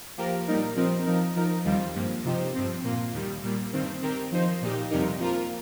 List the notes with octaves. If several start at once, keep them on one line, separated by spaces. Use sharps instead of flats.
F3 A#3 G4 A#4
A#2 G3 D#4 A#4
F3 C4 D#4 A#4
F3 D#4 A#4
F3 D#4 A#4
D#2 D#3 G3 C4 F4
G2 F3 A#3
C3 F3 D#4 G4 C5
G2 F3 C4
A#2 A#3 F4
D#2 D#3 G3
A#2 G3 A#3
G2 D#3 C4
D#3 C4 G4 A#4
F3 D#4 C5
A#2 A#3 D#4 G4
F2 C3 G3 D#4 A#4
F3 A#3 F4 A#4